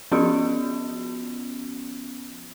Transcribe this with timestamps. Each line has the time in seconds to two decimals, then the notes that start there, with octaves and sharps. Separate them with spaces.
0.12 F3 B3 C#4 F4 F#4